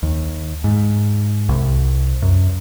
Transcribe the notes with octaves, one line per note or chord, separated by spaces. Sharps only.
D#2
G#2
C2
F#2